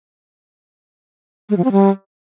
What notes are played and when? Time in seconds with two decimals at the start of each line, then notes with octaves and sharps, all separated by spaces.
1.50 G#3
1.57 F3
1.64 C4
1.72 G3